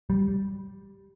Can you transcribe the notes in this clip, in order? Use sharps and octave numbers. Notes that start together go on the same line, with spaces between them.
G3